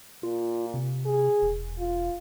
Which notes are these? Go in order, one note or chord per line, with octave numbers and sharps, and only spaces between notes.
A#2 F4
C3
G#4
E1
F4